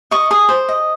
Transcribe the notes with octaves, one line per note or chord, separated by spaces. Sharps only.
D#5 C#6
G#4 D#6
C5
D#5